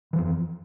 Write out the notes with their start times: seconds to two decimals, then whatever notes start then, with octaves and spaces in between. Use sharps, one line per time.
0.13 E3
0.16 F3
0.18 F2